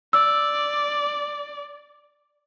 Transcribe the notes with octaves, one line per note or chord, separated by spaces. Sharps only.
D5 E6